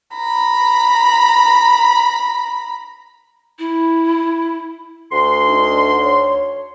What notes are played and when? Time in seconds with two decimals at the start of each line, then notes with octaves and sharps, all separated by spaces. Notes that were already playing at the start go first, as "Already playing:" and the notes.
0.15 A#5 B5
3.59 E4
5.12 D2 C6
5.49 D4 D#4
6.02 C#5